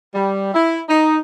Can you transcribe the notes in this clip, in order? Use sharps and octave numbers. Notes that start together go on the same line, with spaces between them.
G3
E4
D#4